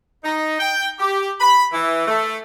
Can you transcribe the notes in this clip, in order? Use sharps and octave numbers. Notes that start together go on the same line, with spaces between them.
D#4
G5
G4
B5
E3
A3